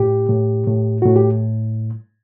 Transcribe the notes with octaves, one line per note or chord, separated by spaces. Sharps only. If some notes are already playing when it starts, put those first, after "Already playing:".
Already playing: A2 G4
A2
A2
A2 F#4
G4